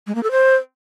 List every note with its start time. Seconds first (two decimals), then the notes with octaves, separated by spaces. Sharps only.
0.07 G#3
0.15 A#3
0.23 A4
0.31 C5